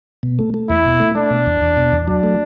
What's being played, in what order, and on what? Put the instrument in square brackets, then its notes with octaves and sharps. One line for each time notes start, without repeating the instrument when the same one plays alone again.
[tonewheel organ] B2
A3
A3
[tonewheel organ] E2 [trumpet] E4
[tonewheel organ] B2
A3
[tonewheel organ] A3 [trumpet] D4
[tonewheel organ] B2
E2
E2
B2
E2
[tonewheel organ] F#3 [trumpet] D4
[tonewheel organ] A3